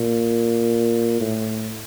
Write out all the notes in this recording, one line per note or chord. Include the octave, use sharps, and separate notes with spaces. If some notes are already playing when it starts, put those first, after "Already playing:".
Already playing: A#2
A2